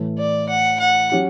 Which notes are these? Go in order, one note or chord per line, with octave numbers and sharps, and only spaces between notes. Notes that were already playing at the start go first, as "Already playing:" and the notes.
Already playing: A2 E3 A3
D5
F#5
F#5
F#3 C#4 G4